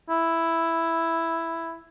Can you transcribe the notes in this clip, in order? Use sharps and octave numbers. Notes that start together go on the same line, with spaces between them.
E4